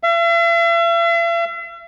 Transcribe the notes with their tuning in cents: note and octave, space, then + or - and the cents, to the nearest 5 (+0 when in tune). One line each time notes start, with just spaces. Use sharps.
E5 +45